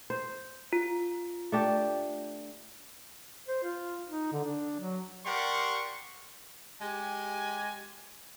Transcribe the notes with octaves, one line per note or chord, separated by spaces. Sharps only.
C5
F4
A3 D4 G4
C5
F4
D#4
D3
D4
F#3
G4 A#4 D5 F#5 C6 C#6
G#3 G4 G#5